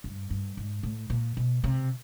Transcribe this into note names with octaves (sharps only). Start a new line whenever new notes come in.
G2
G2
G#2
A2
A#2
B2
C3